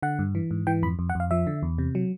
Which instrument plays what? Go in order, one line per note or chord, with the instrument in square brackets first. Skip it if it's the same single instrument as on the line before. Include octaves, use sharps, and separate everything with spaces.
[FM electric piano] D3 F#5
G2
E3
G#2
E3 G5
F2 B5
F2
F#5
F2 F5
F3 E5
D3
E2
C3
F#3